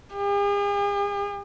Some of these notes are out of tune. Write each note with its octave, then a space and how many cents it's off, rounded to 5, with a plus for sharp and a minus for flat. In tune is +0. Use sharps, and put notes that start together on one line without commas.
G#4 -45